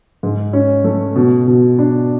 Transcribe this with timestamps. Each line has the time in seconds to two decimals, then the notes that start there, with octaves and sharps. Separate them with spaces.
0.23 G#2
0.53 C#4
0.84 A3
1.16 B2
1.47 B2
1.79 D4